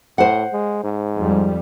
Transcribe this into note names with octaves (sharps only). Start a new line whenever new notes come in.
A2 C5 F#5
G#3
G#2
F2 G3